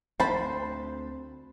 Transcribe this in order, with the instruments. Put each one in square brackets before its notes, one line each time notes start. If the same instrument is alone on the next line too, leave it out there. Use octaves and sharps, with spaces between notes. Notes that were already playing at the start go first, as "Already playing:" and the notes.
[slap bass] D2 C4 [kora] C5 [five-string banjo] A5 B5